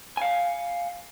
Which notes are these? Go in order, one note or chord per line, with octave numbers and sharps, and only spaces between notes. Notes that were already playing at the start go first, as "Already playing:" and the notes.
F5 G#5